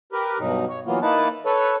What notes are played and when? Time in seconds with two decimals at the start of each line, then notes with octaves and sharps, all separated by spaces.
0.12 G4 A#4 B4
0.39 G2 B2 F#3 D#4
0.68 C#5
0.86 E3 F#3 A#3 B3 F4
1.02 A#3 D#4 E4 B4 A5
1.45 A4 B4 C#5